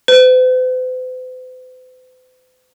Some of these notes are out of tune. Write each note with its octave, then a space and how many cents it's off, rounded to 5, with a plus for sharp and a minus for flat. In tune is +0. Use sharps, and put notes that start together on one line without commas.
C5 -45